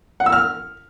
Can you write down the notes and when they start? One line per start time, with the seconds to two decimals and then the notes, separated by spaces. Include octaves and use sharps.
0.20 F#5
0.26 E6
0.32 F6